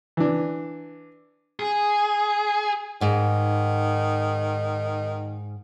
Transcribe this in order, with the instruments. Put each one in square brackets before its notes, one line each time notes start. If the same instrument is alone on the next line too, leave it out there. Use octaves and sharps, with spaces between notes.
[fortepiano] E3 D4
[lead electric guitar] G#4
[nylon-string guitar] G#2 [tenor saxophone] D#3